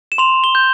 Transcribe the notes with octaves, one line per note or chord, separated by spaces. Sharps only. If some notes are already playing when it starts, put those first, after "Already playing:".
E7
C6 F7
G7
G6